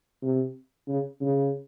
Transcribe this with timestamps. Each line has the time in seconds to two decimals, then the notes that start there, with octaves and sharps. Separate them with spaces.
0.23 C3
0.88 C#3
1.21 C#3